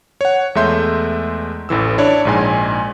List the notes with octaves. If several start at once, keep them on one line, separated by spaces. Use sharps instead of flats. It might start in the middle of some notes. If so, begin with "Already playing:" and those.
C#5 F#5
E2 G#3 A3 E5 C6 G6
A1 A2 E3 E6
D4 E4 C#5 D5
A#1 G#2 G#5